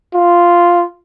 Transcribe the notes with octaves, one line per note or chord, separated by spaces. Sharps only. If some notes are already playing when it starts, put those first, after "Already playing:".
F4